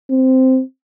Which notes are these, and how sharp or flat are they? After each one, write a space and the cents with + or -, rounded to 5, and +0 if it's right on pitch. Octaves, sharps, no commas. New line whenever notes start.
C4 -5